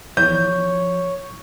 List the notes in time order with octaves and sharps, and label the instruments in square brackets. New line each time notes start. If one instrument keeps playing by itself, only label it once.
[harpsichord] E2 [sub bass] F3 [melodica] C#5 [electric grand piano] G6